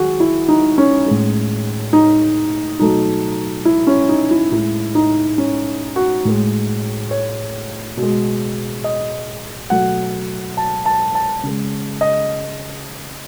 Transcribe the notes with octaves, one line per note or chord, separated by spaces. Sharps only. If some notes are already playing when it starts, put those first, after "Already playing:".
Already playing: D#3 F#3 F#4 G#4
E4
D#4
C#4
A2 G#3
D#4
B2 F#3 A3 D#4
E4
C#4
D#4
E4
A2 G#3 E4
D#4
C#4
F#4
A2 G#3
C#5
B2 G#3
D#5
B2 F#3 A3 F#5
A5
A5
A5
C#3 G#3
D#5